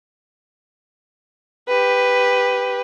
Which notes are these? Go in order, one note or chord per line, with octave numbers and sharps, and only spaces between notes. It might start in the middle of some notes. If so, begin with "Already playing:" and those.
G4 B4